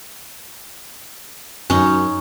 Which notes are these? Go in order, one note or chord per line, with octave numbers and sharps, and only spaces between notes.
F#2 C#4 D#4